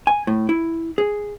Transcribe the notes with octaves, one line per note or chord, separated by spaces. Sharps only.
G#5
A2
E4
G#4